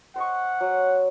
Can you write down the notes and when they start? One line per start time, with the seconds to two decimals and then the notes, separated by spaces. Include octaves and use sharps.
0.16 C5 D#5 F#5 C#6
0.61 F#3